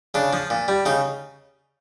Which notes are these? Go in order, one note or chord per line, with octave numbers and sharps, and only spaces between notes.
C#3 D4
F3
A#2
G3
C#3 D#4